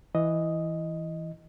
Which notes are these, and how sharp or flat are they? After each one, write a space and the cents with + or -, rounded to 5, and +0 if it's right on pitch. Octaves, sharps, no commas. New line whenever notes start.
E3 +0 D#5 +0